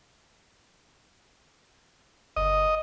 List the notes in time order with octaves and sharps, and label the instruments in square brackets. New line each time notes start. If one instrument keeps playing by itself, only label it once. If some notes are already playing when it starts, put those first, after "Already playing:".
[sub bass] G1 [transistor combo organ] D#5